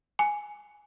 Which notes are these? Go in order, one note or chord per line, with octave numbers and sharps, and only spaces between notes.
G#5